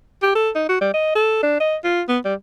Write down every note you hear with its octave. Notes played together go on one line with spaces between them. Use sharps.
G4
A4
D#4
F#4
G3
D#5
A4
D4
D#5
F4
B3
G3